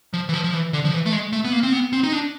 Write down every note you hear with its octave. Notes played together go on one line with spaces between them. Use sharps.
F3
E3
F3
F3
E3
D3
F3
E3
A3
G#3
A3
B3
A#3
C4
B3
C4
D#4
D4